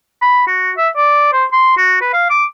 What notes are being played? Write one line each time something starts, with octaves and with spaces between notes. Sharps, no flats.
B5
F#4
E5
D5
C5
C6
F#4
B4
F5
D6